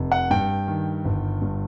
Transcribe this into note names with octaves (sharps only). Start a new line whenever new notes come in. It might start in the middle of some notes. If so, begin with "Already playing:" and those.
Already playing: F1
F#5
G2 G5
D#3
G1
G2